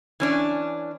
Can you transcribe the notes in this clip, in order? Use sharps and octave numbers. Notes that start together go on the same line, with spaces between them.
E3 C#4 D4